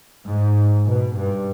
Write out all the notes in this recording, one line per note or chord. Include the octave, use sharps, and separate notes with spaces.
G#2
B2
G2